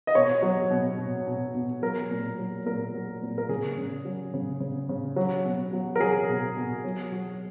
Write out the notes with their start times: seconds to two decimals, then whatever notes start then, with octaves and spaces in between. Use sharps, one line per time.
0.07 D#5
0.15 B2 C#5
0.42 F#3
0.70 B2
0.98 B2
1.27 B2
1.54 B2
1.82 F#3 A#4
2.11 A#2
2.38 F#3
2.65 A#2 A#4
2.94 F#3
3.22 A#2
3.38 A#4
3.49 C#3 G#4
3.78 C#3
4.05 F#3
4.34 C#3
4.60 C#3
4.89 C#3
5.16 F#3
5.45 B2
5.73 F#3
5.96 A#4
6.00 F#3 G#4
6.29 B2
6.57 B2
6.84 F#3
7.12 F#3